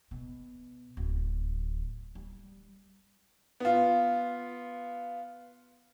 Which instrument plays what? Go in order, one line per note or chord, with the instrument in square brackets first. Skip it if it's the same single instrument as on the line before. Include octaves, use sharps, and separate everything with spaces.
[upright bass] B2
D1
G3
[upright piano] B3 F4